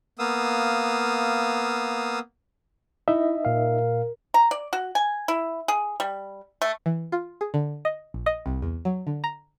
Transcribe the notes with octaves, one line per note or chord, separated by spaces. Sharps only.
A#3 B3 F5 D#6 E6
D#4 E4 D#5 E5
A#2 A#4 F5
A#5
D5
F#4
G#5
E4
G#4
G3
A3
E3
F4
G#4
D3
D#5
A#1
D#5
C2
E2
F#3
D3
A#5